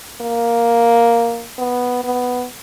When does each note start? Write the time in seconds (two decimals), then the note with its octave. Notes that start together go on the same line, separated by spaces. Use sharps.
0.21 A#3
1.58 B3
2.04 B3